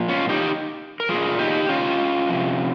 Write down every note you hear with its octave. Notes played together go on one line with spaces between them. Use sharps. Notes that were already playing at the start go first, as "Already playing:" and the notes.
Already playing: A#2 F3
C#4 F4
D#4 G4
A#4
A#2 F3 F4 G#4
D#4 G4
C#4 F4
C3 F3